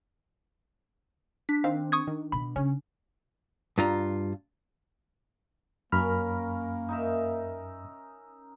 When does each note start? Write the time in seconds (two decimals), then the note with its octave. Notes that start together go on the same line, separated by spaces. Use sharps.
1.49 D4 B6
1.64 D#3 C4 F5
1.92 C#6 D#6 G#6
2.07 D#3
2.32 B2 E3 B5
2.56 C#3 C#4
3.78 G2 F4 A#5
5.92 F#2 A#3 C#4 A#4 B5 F6
6.89 D#4 A#4 E5